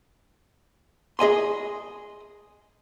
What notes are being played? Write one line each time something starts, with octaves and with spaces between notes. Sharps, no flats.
G#4 D#5 G#5 C6